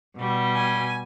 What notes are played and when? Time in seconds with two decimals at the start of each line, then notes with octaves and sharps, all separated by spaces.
0.16 B2 G3
0.56 G#5